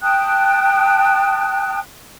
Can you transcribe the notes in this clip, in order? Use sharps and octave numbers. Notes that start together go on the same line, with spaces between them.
G5 A5 D#6 F#6